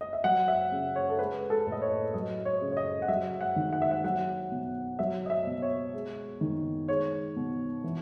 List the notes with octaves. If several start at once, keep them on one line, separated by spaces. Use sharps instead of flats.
D#5
E5
F#3 F#5
E5
C#3
C#5
A4
G#3 B4
A4
A2
D#5
C#5
F#3 D#5
C#5
C#3
C#5
D#5
F#5
F#3 E5
F#5
D#3
F#5
E5
F#5
F#3 F#5
B2
F#3 E5
D#5
E5
B2
C#5
G#3
D#3
G#3 C#5
B2
E3